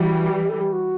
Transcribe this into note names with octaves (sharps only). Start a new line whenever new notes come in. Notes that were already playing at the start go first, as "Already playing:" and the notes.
Already playing: E3 G3 F#4
G4
A4
G4
F#4